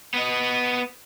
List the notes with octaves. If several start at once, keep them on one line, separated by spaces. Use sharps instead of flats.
B3 D#5